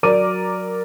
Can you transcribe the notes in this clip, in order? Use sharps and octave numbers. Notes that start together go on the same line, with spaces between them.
F#3 A#4 D5 D6 D#7